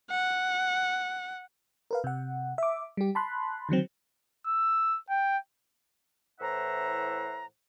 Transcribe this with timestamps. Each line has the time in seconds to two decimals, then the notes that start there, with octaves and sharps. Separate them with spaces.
0.10 F#5
1.91 A#4 B4 F5
2.04 C3 F#5
2.58 E5 D6
2.97 G3 G4
3.15 A5 B5 C6 F#6
3.69 D3 D#3 F#3 C4
4.47 E6
5.10 G5
6.40 A2 E3 C5 E5 F#5 A#5